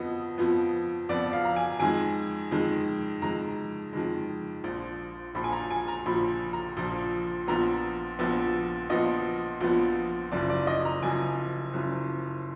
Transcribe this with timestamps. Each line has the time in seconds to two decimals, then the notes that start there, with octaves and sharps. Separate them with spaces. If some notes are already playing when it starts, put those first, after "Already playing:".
Already playing: F2 F3 B3 D#5
0.38 F2 F3 B3
1.09 F2 F3 B3 D5
1.33 F5
1.45 A#5
1.56 G#5
1.80 F2 D#3 G#3 G#5
2.51 F2 D#3 G#3
3.22 F2 D#3 G#3 A#5
3.93 F2 D#3 G#3
4.64 A#1 A#2 F3
5.35 A#1 A#2 F3 B5
5.44 G#5
5.52 A#5
5.70 G#5
5.88 A#5
6.06 A#1 A#2 F3 B5
6.53 A#5
6.77 A#1 A#2 F3
7.48 A#1 A#2 F3 B3 A#5
8.19 A#1 A#2 F3 B3
8.90 A#1 A#2 F3 B3 D#5
9.61 A#1 A#2 F3 B3
10.31 F#1 F#2 F3 D5
10.49 D5
10.67 D#5
10.85 A#5
11.03 F#1 F#2 F3 G#5
11.73 F#1 F#2 F3